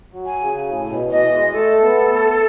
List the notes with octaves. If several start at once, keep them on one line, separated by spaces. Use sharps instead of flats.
F#3
G#5
C#3
A2
B2
E3 D#5
G#3
A3 A4
B3
A3